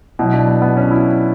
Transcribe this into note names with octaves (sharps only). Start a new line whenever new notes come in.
B2 F#3 E4
D4
B3
B3
C#4
E4